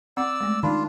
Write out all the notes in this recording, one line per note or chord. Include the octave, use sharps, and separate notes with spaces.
C4 D5 F#5 E6
G#3 A3
D#3 D4 F4 B5